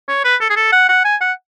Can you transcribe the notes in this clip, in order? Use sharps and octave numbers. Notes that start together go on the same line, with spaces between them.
C#5
B4
A4
G#4
A4
F#5
F#5
G#5
F#5